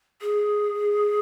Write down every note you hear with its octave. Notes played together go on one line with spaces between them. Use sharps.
G#4